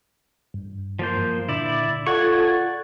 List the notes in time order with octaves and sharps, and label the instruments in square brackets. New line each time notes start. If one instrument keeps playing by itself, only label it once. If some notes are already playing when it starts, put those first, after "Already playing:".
[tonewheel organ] G2
[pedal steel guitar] F3 A#3 C5
[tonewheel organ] A#2 D3 [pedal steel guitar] E4 D5
[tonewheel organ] F4 A4 G#6 [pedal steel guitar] D5 F#5 C#6